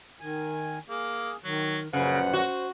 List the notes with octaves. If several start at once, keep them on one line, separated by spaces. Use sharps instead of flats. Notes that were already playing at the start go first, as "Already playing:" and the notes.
D#3 G#5
A#3 G#4
D#3 F#3
A#1 F#2 C#3 B4 C5 F#5
F#4